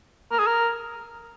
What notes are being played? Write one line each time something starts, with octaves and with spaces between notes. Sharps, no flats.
A#4
G#4
A#4